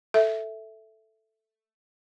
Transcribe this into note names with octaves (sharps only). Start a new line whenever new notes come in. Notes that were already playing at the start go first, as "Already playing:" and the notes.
A4 E5